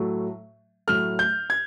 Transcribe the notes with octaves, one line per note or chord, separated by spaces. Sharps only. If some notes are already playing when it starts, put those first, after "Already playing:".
Already playing: A2 F#3 A3
A2 F#3 A3 F6
G6
G#6